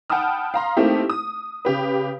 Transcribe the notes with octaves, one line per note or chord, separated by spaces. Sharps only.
F#5 G5 A5 B5 D#6 F6
F5 A#5 C6
A3 A#3 C4 D#4 E4 G4
D#6
C#3 G4 B4